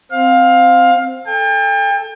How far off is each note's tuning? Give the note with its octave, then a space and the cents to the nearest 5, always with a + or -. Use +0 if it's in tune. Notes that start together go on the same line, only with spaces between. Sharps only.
C4 +0 F5 +20
A4 +0 G5 +40